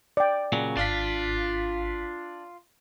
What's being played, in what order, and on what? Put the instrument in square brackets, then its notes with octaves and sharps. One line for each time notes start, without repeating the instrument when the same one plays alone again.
[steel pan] D5 G5
[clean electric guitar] A#2 C#3 F#3
[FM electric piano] G#1 F5 B6 [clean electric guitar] D4 [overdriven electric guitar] F4